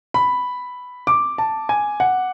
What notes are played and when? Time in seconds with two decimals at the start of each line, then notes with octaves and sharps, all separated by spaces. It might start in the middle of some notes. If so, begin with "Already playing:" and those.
0.14 B5
1.07 D6
1.38 A5
1.69 G#5
2.00 F#5